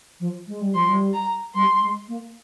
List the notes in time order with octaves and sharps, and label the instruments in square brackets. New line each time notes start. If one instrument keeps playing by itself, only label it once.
[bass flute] F3
G#3
G3
[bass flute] F3 [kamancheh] C6
[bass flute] G3
[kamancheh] A#5
[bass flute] G3 [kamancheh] C6
[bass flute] G#3
A#3